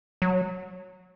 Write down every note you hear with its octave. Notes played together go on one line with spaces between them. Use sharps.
F#3